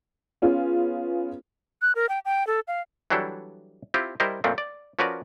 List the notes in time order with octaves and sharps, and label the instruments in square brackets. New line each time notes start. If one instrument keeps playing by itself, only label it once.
[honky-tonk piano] B3 C#4 F4 G#4
[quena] F#6
A#4
G5
G5
A4
F5
[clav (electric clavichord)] E3 F#3 G3 D4 E4 A4
C4 E4 F4 G4
G3 E4 A#4 C5 D#5
F2 A#2 F3 A3 C4
D5
F3 C#4 F#4 A#4 B4 D5